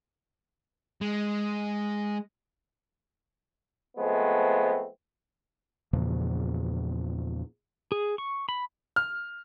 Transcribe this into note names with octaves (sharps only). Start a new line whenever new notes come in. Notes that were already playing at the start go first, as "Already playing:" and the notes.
G#3
F3 G#3 A3 B3 C4
E2 A#2 C#3 F3
G#4
C#6
B5
F6